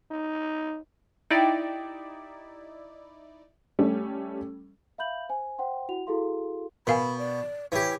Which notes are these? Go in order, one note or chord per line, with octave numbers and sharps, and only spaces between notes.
D#4
D#4 E4 G4 D5
G3 A3 C#4
E5 F5 B5 G6 F#7
C5 G#5
C5 F#5 G5 C6
E4 F#4 F#5 F7
E4 F#4 G#4 A4 F5 C6
B2 A#4 F5 G#5 B5
D5
E3 G4 C#5